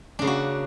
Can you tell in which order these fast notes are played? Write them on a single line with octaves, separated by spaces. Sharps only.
D4 C#3 A#3 F#4